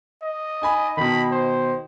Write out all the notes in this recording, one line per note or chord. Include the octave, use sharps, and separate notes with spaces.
D#5
D#4 G#5 B5
B2 D#3 B5
C5